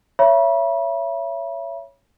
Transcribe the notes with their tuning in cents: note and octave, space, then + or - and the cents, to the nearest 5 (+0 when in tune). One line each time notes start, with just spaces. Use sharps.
C#5 +0 E5 +30 B5 -40